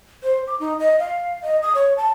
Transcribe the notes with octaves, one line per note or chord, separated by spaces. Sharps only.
C5
D6
D#4
D#5
F5
D#5
D#6
C#5
A5